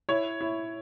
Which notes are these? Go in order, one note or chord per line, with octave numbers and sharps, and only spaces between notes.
E4 C#5
E4